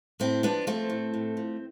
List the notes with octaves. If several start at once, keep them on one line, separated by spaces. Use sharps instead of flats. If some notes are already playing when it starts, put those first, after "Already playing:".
A2 C4 E4
F3 B3 D4
F3 A3 C4
A2
A2
F3